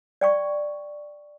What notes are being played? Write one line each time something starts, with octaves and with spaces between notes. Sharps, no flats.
D5 G5 C#6